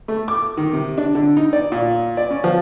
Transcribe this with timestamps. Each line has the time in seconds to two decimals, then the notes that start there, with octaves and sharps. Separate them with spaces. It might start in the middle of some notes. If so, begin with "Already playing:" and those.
0.08 A3
0.28 D6
0.57 D#3
0.73 C3
0.98 D4
1.15 D3
1.37 D#4
1.53 D5
1.72 A#2
2.17 D5
2.30 C#4
2.44 F3